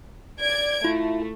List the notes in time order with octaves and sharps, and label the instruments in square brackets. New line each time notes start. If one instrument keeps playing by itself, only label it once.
[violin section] D5 G#6 D7
[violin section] A3 [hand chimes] E4 F4